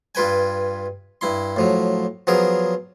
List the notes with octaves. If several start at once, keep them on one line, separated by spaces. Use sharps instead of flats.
G2 F4 B4 G5 G#5
G2 E4 C6
A2 F3 F#3
F3 F#3 B3 G#4 A#4